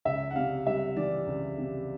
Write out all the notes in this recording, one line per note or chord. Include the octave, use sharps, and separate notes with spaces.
C#2 E5
F#5
C3 F5
G3 E5
E3 D5
C#2
C3